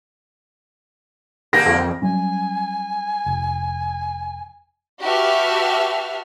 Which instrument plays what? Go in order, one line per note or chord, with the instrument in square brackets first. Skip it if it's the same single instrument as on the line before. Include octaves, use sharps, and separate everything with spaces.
[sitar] D3 A#3 G4 [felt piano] A#6
[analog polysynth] F2
[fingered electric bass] F#3 G3 C#4 [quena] G#5
[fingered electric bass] F1
[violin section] F#4 G4 B4 E5 A5 F6